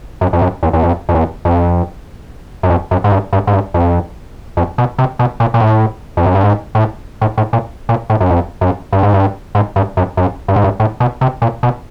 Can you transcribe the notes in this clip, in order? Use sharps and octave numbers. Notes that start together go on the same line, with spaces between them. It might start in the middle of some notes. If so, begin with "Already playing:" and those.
F#2
F2
F#2
E2
E2
F2
F2
E2
F2
F#2
F2
F#2
G#2
G2
G2
G#2
G2
F2
F2
B2
C3
B2
A#2
A#2
A2
F2
F#2
G2
G#2
A2
A2
A2
A#2
A#2
A2
F#2
F2
F#2
G2
G#2
G2
G#2
G2
F#2
F#2
G2
G#2
G2
A2
B2
C3
A#2
B2